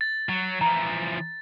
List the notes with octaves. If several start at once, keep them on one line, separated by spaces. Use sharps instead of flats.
A6
F#3
E3 F3 A#5